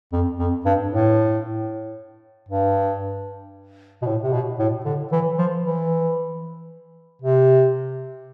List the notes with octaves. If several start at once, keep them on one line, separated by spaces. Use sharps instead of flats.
F2
F2
G2
A2
G2
B2
A2
C3
B2
A2
D3
E3
F3
E3
C3